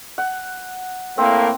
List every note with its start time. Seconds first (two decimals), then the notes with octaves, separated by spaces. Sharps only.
0.18 F#5
1.18 A2 A#3 C4